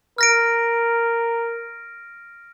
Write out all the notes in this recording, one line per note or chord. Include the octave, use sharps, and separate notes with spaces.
A#4 F6 A#6 D7